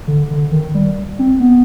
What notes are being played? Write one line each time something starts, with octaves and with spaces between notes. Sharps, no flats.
D3
D3
D#3
G3
C4
B3